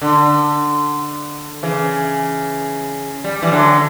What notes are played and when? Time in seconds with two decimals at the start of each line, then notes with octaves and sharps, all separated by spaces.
0.02 D3
1.63 C#3 E3
3.24 G3
3.42 E3 G3
3.52 D3 F#3